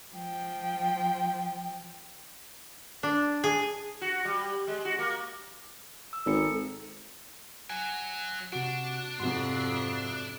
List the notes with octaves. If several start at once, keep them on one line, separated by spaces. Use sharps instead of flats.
F3 G5
D4
G#4
F#4
G3
G#3
F#4
A#3
E6
G#1 A4 C#7
F#3 G#5
C3 D4 F#4
F2 G#2 C3 F#4 C6